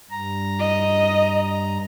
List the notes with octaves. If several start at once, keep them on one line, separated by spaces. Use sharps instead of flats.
G2 A#5
D#5